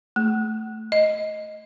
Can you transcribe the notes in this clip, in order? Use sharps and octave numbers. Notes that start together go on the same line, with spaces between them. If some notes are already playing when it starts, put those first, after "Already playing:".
A3
D#5